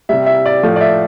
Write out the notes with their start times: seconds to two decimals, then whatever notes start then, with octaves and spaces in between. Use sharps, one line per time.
0.09 C3 G3 E5
0.26 E5
0.46 D5
0.63 A2 F3 A3
0.76 D5
0.81 E5